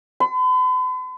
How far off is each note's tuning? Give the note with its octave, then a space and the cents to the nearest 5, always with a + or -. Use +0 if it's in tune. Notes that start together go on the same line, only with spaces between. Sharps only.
B5 +45